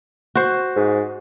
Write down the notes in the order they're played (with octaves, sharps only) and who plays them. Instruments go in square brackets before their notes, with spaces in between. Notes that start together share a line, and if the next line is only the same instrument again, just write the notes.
[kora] F#4 C5
[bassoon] G#2